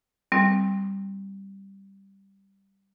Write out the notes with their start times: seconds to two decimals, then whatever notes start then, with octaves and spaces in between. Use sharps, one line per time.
0.32 G3 C4